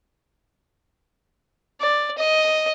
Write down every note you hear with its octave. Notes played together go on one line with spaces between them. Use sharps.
D5
D#5